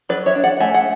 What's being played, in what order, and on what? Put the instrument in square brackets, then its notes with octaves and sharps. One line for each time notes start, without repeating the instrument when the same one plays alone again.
[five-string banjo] F#3 B4 D5
C#5 E5
D4
D5 F#5
A3 E5 G#5
F#5